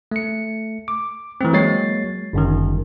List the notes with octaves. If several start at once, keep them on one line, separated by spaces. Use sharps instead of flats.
A3 C#7
D6
E3 A3 C4
F#3 G#3 A#3 C#5 A6 C7
G1 F#2 D#3